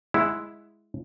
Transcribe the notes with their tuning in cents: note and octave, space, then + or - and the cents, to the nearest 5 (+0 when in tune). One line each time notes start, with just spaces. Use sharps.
G#3 +0 E4 +0 F#5 -5